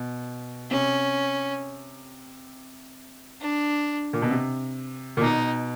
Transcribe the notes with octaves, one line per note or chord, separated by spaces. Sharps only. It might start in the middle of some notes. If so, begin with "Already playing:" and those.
Already playing: B2
C3 C#4
D4
A#2
B2
C3
A#2
B2 D#4